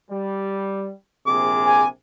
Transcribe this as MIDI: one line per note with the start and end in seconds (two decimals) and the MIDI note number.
0.11 0.91 55
1.27 1.85 34
1.27 1.85 48
1.27 1.85 68
1.27 1.83 86
1.66 1.88 80